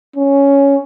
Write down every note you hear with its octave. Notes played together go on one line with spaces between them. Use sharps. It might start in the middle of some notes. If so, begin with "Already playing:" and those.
C#4